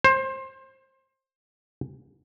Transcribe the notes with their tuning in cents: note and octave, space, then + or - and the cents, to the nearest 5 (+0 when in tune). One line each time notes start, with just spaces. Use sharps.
C5 +25